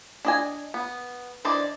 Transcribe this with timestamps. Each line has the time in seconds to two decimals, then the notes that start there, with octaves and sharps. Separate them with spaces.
0.25 D4 D#5 G#5
0.74 B3
1.45 E3 D4 C5 D5 D#5